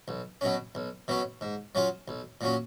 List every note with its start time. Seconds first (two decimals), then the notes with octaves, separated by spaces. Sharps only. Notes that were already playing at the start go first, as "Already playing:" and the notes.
0.08 B1
0.41 B2 F#3 C#4
0.75 B1
1.08 B2 F#3 C#4
1.41 G#2
1.75 F#3 C#4 F4
2.08 B1
2.41 A#2 F#3 C#4